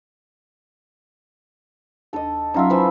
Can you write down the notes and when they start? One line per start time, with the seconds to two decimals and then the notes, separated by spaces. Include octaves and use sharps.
2.13 D#2 D4 A4 D#5
2.54 F#3 C#4 D#4 F4 E5
2.70 E3 F3 B4